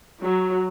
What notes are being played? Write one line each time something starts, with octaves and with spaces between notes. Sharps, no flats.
F#3